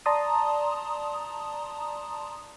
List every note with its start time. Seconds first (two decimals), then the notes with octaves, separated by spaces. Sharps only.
0.06 D5 A5 A#5 C6 D#6